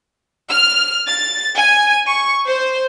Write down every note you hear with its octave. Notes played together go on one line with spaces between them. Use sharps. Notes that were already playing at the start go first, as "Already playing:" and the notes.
F6
A6
G#5
C#6
C5